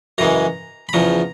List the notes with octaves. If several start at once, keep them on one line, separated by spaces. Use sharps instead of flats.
F#2 C#3 E3 G#3 A#5
B5
E2 C#3 F3 A#5